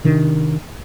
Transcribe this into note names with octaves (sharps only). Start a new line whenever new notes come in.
C3 D#3 D4